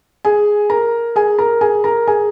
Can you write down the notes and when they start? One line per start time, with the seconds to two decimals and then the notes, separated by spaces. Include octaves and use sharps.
0.25 G#4 G#5
0.70 A#4 A#5
1.16 G#4 G#5
1.38 A#4 A#5
1.61 G#4 G#5
1.84 A#4 A#5
2.07 G#4 G#5